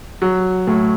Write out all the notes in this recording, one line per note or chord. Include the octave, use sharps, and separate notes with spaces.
F#3
A2